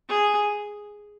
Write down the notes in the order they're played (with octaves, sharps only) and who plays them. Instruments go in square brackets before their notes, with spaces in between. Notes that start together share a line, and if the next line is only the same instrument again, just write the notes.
[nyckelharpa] G#4